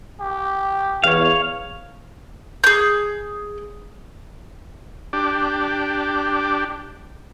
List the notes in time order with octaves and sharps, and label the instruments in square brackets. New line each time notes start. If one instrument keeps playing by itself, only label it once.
[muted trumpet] G4
[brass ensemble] E2 [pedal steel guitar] C#5 F5
[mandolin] G#4 G6
[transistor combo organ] D4 G4